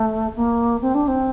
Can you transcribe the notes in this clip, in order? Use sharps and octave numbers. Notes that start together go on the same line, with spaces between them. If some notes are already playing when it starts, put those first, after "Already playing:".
Already playing: A3
A#3
C4
D4
C4